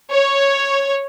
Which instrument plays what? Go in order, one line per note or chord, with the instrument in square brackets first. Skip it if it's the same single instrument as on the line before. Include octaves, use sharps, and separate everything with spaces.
[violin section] C#5